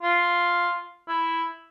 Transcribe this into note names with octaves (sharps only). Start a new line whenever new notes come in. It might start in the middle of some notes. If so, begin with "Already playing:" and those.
F4
E4